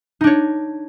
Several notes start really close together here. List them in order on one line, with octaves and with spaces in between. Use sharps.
D#4 D4 C#5